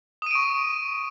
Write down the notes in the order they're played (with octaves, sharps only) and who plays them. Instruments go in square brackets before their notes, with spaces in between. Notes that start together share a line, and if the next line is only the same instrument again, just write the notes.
[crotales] D#6
D#7
D7
C#6